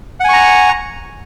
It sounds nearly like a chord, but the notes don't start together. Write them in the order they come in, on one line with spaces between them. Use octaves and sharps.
F#5 G#5 C#6 A#5